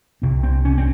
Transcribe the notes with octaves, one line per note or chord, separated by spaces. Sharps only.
C2 C3 C4
C4
C#4
C4